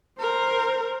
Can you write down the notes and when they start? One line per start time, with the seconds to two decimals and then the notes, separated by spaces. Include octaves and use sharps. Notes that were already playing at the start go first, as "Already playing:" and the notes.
0.20 A#4 C5